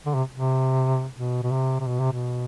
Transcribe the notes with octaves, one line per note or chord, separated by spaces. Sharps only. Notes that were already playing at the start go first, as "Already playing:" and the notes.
D3
C3
C3
B2
B2
C3
C3
B2
C3
B2